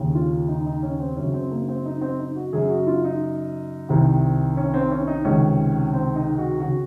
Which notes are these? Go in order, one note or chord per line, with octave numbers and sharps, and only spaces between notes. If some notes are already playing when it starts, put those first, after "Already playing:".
Already playing: D#2 C#3
F4
D#4
D#4
C#4
C4
F#2 C#3 C#4
C4
A#3
C4
D#4
C4
D#4
F#4
F#2 C#3 G#4
F#4
F4
D#4
C2 C3 D#3
C#4
C4
C#4
D#4
C#2 C3 D#3 C#4
C4
D#4
F#4
C#3 F#4